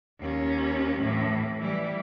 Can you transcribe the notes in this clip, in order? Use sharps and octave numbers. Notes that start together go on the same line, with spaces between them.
D#2 C#4
A2 E3
E3 G3